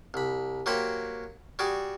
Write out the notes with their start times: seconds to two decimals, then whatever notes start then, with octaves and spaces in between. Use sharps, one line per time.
0.14 C2 B5
0.66 F#3 A#3 G4 C5 F#5 B5
1.59 G3 F#4 G#4 D6